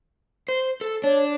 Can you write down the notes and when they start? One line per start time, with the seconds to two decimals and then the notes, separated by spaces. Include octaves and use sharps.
0.48 C5
0.81 A4
1.04 D4 C#5